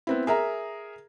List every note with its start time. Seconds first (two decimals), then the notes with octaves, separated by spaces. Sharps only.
0.07 B3 C4 E4
0.27 G#4 A#4 E5 A#5